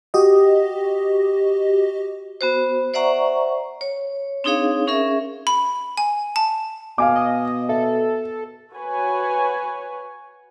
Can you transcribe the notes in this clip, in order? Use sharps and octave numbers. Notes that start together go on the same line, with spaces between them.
F#4 G4 D#5
B3 F#4 C5
C5 D5 E5 F#5 A#5 C#6
C#5
C4 D4 D#4 G#4 C#5 F5
C#4 G#4 A#4 E5
B5
G#5
A5
B2 F5 G#5 D6
D#5
A4 E5
F#4 B4 C#5 G#5